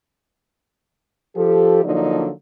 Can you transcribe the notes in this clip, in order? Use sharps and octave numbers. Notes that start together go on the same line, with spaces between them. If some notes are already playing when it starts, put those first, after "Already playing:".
F3 G4 A4
D3 F3 F#3 A#3 D4 D#4